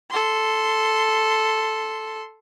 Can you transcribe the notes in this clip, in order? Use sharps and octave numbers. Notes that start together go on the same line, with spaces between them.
A4 C6